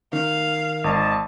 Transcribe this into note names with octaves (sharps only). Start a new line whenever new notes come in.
D#3 F5
G#1 D#5 A5